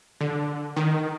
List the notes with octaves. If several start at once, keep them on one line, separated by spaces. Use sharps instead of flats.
D3
D#3